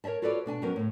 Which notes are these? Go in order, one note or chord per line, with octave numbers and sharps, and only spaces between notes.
A#4 C#5 D5 E5 A5
F4 F#4 A4 B4 C#5 D5
B2 D4 G#5 A5
F2 F#3 B3 C#4 A#4
A2 C#3